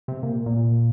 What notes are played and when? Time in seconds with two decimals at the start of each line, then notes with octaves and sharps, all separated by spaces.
0.08 C3
0.23 A#2
0.46 A#2